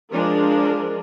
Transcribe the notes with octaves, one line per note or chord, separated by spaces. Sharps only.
F3 G#3 D4 A#4